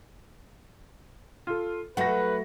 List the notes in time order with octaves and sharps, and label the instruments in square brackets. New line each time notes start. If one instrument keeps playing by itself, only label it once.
[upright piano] F4 A4
[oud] F#3 A3 [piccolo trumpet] B4 [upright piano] F#5 A#6